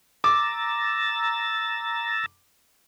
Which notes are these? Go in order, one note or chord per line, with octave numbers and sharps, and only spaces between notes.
A#5 D6 E6 A6